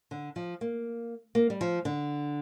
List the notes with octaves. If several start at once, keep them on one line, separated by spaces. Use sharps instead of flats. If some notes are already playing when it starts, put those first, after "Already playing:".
D3
F3
A#3
A#3
G3
F3
D3